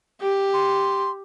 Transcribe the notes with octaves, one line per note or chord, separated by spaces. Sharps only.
G4
C6